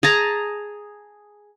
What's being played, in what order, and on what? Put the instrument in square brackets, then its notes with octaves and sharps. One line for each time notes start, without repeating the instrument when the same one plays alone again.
[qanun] G#4 A5 A#5